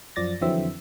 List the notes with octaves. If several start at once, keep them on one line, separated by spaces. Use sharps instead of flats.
F#2 F3 D5 A6 A#6
F2 D3 E3 F#3 C4 E5